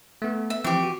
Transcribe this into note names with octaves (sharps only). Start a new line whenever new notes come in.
A3 B3
E5
E3 F3 C4 G4 C#6
F#4